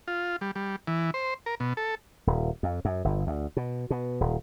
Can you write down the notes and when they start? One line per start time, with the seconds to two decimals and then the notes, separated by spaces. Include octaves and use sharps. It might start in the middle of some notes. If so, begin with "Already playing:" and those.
0.08 F4
0.41 G3
0.56 G3
0.87 E3
1.14 C5
1.46 A#4
1.60 B2
1.77 A4
2.27 D#1
2.63 F2
2.85 F#2
3.04 G1
3.27 D2
3.57 B2
3.90 B2
4.21 D#1